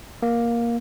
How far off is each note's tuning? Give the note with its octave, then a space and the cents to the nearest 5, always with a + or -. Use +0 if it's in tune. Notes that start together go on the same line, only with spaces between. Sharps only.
A#3 +10